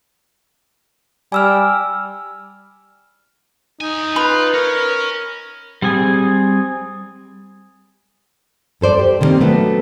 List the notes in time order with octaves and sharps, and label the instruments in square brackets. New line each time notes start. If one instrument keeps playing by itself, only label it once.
[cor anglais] G3 [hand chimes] G#5 E6 F6
[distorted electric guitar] E2 G#5 [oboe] D#4
[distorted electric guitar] F4 [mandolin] B4
[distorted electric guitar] C#4 [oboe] A#4
[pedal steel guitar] G3 C4 G#4 G#5
[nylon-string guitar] G2 A4 C5 D5
G4
D3 D#3 F3 G3 A#3 C4
F#3 A3 B3 D4 F#4